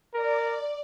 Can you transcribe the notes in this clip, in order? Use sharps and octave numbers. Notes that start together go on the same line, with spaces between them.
A#4 D5